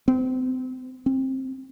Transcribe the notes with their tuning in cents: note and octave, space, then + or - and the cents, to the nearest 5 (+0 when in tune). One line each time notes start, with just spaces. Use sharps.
C4 -35
C4 +15